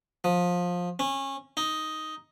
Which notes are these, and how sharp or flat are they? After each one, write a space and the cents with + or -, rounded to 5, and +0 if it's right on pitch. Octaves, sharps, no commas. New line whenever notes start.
F3 +20
C#4 -25
D#4 +5